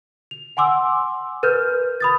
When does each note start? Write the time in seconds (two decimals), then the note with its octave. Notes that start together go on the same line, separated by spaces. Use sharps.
0.31 F7
0.57 F#5 G#5 C6 D6 E6
1.43 A#4 B4 F6 G6
2.00 B5 D#6 A6